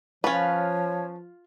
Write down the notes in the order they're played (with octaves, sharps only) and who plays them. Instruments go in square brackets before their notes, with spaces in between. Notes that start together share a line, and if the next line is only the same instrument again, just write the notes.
[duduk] F3 [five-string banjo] C#4 B4 [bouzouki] F4 F5 [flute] C#5